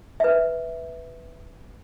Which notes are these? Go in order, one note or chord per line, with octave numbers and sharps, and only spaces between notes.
B4 E5